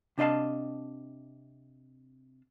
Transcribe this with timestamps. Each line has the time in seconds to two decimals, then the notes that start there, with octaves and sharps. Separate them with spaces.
0.18 C3 D4 D#5 F5 A5